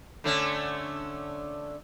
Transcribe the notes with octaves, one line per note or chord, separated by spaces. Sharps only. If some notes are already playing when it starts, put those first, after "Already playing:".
D3 A3 C#4